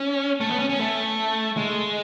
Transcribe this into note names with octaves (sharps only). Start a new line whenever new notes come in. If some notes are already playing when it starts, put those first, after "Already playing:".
Already playing: C#4
A3
B3
C#4
C#4
A3
G#3